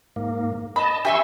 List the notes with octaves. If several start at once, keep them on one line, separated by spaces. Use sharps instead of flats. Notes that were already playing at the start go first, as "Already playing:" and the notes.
G#2 A#3
D#5 A5 B5
F2 G4 E5 G#5 C6 C#6 E6